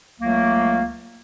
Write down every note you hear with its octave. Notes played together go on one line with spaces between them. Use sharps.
C#2 F#3 A3 A#3